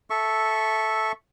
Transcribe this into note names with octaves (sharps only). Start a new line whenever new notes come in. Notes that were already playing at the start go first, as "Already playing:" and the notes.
A4 E5 C#6